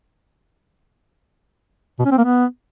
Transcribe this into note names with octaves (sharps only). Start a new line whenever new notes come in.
B2
C#4
C4
A#3
B3